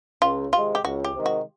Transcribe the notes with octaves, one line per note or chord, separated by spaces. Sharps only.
C#2 F4
C3 D#3 G#3 F4
G4
C#2 F#4
G4
C3 D#3 G#3
F#4